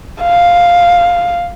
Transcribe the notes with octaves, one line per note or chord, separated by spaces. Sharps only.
F5